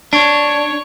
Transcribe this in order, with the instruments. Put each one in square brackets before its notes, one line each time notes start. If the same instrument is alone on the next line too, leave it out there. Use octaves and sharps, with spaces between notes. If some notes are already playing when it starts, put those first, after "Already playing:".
[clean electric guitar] D4 [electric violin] C#5